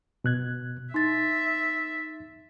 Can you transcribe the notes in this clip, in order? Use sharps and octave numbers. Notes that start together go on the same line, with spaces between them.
B2 F#6 G#6
D#4 E5 C6 A6